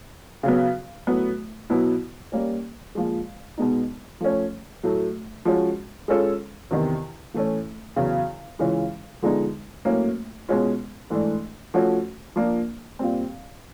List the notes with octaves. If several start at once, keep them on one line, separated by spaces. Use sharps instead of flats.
C#3 F#3 B3
A2 F#3 B3
B2 F#3 B3 E4
G3 A#3 C#4
A#2 F3 G#3
B2 G#3 B3 D#4
F3 A3 C#4
A2 F#3 A3
F3 G#3 C#4 F#4
G#3 C#4 F4 A4
E2 C3 D#3
A2 E3 A3 C#4
E2 C#3 F#3
C#3 E3 G#3 C#4 F4
D3 F3 G#3 B3 D#4
A2 F#3 A#3 C#4
B2 G#3 C#4 F4
G#2 E3 A3 D4
F3 A3 C#4 F#4
F3 A#3 D4 F4
A#2 G3 C4